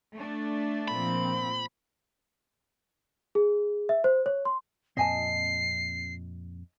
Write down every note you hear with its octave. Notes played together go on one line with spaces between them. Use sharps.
A3 D4
A#2 F3 C4 B5
G#4
E5
C5
C#5
C6
F2 A#2 C4 D#5 G#5 A5 C7